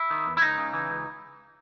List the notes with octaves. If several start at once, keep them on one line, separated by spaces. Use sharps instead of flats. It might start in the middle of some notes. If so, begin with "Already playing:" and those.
Already playing: E4
D#3
E2
E4
C#2 D#4
C#3
E3
C#2